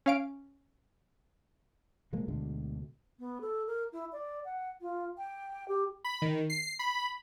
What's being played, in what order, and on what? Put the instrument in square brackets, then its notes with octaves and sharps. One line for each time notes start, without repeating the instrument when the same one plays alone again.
[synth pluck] C#4 F5 D7
[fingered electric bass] B2 F3 G#3 A#3
D2 B2 D3 G#3
[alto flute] B3
A4
A#4
E4
D5
F#5
F4
G5
G4
[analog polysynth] B5
D#3
C7
B5